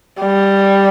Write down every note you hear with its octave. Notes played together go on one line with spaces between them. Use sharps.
G3